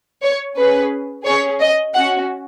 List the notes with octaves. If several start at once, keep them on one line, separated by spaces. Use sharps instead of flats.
C#5
C#4 G#4 B4
C#4 G#4 C#5
D#5
C#4 F#4 F#5